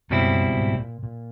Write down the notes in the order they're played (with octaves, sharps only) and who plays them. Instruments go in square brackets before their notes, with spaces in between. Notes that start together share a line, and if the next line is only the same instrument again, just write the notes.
[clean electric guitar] C#2 B2 G3 C4 E4 [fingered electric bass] F#2
[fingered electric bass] G#2
A#2
A#2